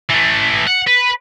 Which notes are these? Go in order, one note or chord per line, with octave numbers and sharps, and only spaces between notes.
E3 A3
F#5
B4